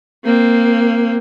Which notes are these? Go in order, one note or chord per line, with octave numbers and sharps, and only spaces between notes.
A#3 C4